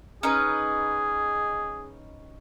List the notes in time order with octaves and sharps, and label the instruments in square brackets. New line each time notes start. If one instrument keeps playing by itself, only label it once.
[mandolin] C#4 D#4 B4 [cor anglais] G#4